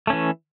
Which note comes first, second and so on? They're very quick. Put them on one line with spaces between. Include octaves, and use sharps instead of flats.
A3 C#4 E3